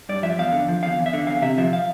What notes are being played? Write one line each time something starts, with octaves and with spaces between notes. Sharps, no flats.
G2 D5
F3 E5
E2 F5
D3
F3
E2 F5
E2
E5
D3
E2 F5
C3 E5
F3 E5
F5